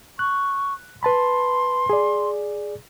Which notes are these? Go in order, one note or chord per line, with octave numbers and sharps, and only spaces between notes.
C#6 F#6
B4 A5 B5 C6
G#4 D5